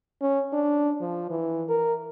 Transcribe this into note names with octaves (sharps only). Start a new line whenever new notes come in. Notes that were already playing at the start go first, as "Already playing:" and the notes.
C#4
D4
F3
E3
A#4